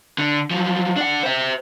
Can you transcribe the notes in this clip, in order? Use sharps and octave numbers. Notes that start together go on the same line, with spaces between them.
D3
F3 F#3
D4 F#5
C5 E5